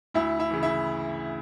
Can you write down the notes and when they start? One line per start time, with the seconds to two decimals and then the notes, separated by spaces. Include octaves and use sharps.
0.14 D2 E4 E5
0.39 E4 E5
0.51 C#3 E3
0.63 E4 E5